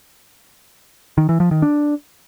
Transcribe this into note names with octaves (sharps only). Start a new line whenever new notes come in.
D#3
E3
F3
D#3
D4